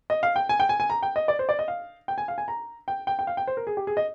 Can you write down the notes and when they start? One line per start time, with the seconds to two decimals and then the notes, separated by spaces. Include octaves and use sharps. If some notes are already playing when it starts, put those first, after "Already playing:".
0.10 D#5
0.23 F5
0.36 G5
0.49 G#5
0.60 G5
0.69 G#5
0.80 G#5
0.90 A#5
1.03 G5
1.16 D#5
1.28 D5
1.39 C5
1.49 D5
1.59 D#5
1.68 F5
2.08 G5
2.18 G#5
2.28 F5
2.38 G#5
2.48 A#5
2.88 G5
3.07 G5
3.19 G5
3.27 F5
3.37 G5
3.47 C5
3.57 A#4
3.67 G#4
3.77 G4
3.87 G#4
3.97 D#5